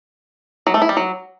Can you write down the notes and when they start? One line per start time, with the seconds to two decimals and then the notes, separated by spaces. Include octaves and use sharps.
0.67 F#3
0.74 A3
0.82 E4
0.89 G3
0.97 F#3